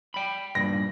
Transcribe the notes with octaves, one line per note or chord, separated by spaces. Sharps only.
G5 B5
G2 A#2 A#6